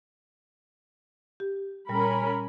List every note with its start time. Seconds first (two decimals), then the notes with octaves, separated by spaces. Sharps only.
1.40 G4
1.89 A#2 G3 C#4 A#4 B5